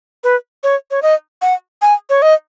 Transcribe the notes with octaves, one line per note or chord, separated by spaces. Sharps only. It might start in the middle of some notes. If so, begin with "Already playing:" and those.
B4
C#5
C#5
D#5
F#5
G#5
C#5
D#5